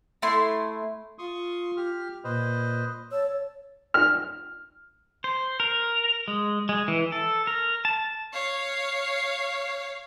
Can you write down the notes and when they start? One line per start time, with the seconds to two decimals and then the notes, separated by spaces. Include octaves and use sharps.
0.22 A3 E4 C6
1.19 F4 C6 C#6 D#6
1.77 G4 F6
2.24 A#2 B4 C5 D#5
3.12 C#5 A5 E6
3.94 F6
5.24 C5
5.60 A#4
6.28 G#3
6.69 G#3
6.88 E3
7.12 A4
7.47 A#4
7.85 A5
8.33 C#5 F5